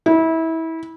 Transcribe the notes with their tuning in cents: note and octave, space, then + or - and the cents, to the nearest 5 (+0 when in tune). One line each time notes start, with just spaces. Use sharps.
E4 -25